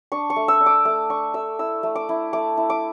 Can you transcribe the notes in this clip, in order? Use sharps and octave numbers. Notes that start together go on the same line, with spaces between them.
D4 C#6
C#6
A3
E6
D4
D6
A3 D6
D4 C#6
A3 E6
E4 E6
A3
D6
E4
A3 D6
E4
D6